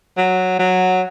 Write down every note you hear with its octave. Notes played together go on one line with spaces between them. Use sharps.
F#3
F#3